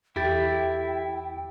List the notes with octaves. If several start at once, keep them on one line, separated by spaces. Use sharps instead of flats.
E2 E4 G4 G5 A6